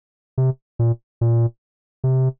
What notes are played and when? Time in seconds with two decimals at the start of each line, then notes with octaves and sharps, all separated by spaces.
0.38 C3
0.79 A#2
1.21 A#2
2.04 C3